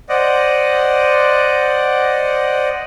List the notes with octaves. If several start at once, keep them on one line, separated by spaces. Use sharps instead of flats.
C5 D5 D#5 F#5